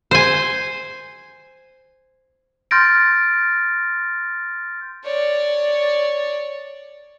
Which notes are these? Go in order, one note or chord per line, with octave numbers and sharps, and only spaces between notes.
C5 G#5
C6 F6 G6 A6 A#6 D7
C#5 D5